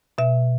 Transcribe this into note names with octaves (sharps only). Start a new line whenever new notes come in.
B2 E5